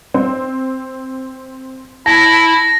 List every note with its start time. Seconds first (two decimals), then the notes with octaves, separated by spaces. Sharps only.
0.14 C4
2.06 E4 A5 A#6